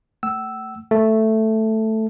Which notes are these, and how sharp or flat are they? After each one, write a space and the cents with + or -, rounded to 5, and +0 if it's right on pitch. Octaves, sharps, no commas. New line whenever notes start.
A3 +20 F#5 +45 E6 +0
A3 +0 A4 +0